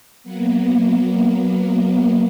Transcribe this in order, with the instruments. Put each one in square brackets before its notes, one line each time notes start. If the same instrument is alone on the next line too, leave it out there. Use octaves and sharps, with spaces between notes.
[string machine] F#3 A#3 B3